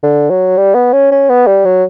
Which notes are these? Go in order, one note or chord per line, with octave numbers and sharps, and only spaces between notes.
D3
F#3
G3
B3
C#4
C#4
B3
G3
F#3